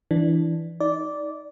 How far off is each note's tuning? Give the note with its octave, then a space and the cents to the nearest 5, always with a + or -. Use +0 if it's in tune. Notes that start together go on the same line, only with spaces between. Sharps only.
E3 +0 D4 +0
D#4 +20 D5 -10